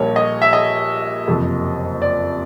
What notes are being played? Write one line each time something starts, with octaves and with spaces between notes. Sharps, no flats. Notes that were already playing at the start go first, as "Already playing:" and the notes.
Already playing: A#1 A#2 G3 C#5
D#5
E5
D#5
F#1 F2 C3
D5